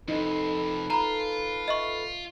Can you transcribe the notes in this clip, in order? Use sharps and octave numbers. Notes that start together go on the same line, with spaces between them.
F2 C3 D#4 A4 B4
F4 A#5 B5
D#5 E5 C#6